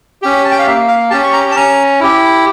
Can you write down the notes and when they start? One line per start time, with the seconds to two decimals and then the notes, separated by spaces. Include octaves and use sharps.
0.22 C#4 G4
0.45 A5
0.51 G5
0.59 F5
0.66 A#3 E5
0.88 F5
1.10 C#4 G4 A5
1.24 C#6
1.33 A#5
1.51 A5
1.55 C#4 A#5
2.00 E4 G4